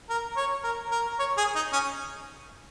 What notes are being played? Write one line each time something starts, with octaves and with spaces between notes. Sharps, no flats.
A#4
C#5
A#4
A#4
C#5
G#4
D#4
C#4